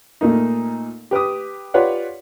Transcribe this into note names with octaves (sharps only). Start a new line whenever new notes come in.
A#2 A3 A#3 D#4
G4 B4 D6 D#6
F4 G4 B4 C#5 D5 F#5